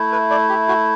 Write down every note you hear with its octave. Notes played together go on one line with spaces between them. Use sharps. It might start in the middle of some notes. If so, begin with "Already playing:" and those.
Already playing: A3 E4
B4
D5
G4
F#4